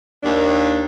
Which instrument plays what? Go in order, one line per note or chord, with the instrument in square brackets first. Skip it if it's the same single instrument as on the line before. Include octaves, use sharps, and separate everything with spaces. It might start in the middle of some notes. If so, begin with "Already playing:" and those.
[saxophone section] D#2 D4